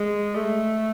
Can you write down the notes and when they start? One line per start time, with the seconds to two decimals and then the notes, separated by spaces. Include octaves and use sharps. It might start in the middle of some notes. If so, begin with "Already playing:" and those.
Already playing: G#3
0.35 A3